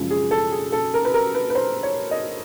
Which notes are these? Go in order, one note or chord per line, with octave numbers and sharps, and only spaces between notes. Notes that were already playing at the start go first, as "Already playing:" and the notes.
Already playing: F#2 C#3 F3 G#3
G#4
A4
G#4
A4
A#4
B4
A#4
B4
B4
C5
C#5
D#5